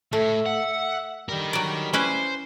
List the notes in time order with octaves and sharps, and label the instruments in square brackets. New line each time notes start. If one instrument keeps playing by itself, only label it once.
[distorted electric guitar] A2 [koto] A3 [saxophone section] E5
[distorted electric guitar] F#5
[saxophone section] D3 G3 [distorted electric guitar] D#4 A#4
[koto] F#3 D5
[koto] C#4 E4 B4 [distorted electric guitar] C5